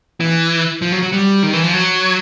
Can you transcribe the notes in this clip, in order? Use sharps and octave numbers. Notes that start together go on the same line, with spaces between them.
E3
F3
F#3
F#3
G3
D#3
E3
F3
F#3